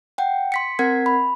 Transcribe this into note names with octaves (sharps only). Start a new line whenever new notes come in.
F#5 G5
C6 B6 C#7
C4 A#4 F#5 G#6 B6
B5